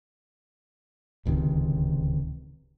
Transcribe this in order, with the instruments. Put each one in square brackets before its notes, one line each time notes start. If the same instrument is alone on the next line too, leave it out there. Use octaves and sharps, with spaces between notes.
[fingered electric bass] D1 C#2 C3 D#3